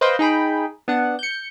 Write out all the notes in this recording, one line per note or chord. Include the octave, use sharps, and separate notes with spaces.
B4 C5 D#5 F5 G5 C6
D#4 G#4 G5 B5
B3 D4 F#5
G6 C#7